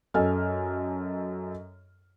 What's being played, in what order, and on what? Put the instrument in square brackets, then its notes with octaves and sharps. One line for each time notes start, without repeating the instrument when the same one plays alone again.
[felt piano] F#2 A4 D#5 G#5 F6